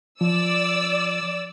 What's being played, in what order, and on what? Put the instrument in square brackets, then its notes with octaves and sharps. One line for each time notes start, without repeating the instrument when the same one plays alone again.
[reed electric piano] F3 [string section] D5 E6